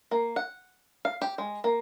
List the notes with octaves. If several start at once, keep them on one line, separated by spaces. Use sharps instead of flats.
A#3
F#5
F5
G4
G#3
A#3